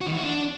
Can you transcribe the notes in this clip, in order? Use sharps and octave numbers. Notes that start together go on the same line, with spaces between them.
F#4
D#3
E3
F#4
D4